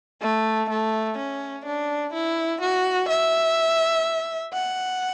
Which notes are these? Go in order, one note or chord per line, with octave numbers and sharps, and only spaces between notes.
A3
A3
C#4
D4
E4
F#4
E5
F#5